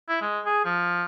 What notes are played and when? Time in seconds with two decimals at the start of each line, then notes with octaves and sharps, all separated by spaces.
0.09 E4
0.22 G#3
0.45 G#4
0.65 F3